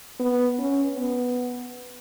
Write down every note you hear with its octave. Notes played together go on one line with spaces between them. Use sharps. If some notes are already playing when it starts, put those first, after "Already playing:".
B3
C#4
B3